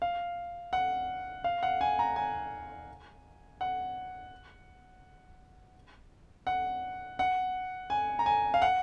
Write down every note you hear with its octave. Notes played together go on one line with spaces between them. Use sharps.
F5
F#5
F5
F#5
G#5
A#5
G#5
F#5
F#5
F#5
G#5
A#5
G#5
F5
F#5